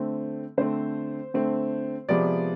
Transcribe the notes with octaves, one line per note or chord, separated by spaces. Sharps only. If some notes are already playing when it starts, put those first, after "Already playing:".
Already playing: D3 A3 C4
D3 A3 C4 C5
D3 A3 C4
C3 F3 G#3 B3 D5